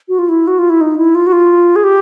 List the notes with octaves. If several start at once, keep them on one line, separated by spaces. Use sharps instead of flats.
F#4
F4
E4
F#4
F4
E4
D#4
E4
F4
F#4
F4
G#4
G4